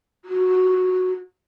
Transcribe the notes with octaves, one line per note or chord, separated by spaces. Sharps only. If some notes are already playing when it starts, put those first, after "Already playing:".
F#4